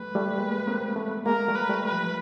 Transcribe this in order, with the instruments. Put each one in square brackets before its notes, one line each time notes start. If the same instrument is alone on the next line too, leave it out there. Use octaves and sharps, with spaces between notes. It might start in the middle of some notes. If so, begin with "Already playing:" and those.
Already playing: [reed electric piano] G3 A3 [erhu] B4
[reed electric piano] G3 A3
G#3 A#3
A#3 C4
A3 B3
[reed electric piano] G#3 A#3 [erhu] A#4
[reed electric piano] G3 A3
[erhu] B4
[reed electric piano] G3 A3
[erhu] B4
[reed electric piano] F3